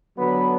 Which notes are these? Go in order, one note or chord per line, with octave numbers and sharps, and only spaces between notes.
D3 F#3 B3 B4